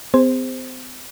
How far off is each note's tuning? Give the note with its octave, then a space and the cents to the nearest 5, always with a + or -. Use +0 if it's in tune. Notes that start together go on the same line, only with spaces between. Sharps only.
C4 -45 G#4 -30 C5 +0